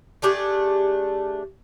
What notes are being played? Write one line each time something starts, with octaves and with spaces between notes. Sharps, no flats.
A3 D4 G4 G#4